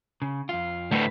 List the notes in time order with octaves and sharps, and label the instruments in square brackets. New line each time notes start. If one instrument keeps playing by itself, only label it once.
[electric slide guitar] C#3
F2 F4
[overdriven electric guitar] D2 A2 [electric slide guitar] A3 B4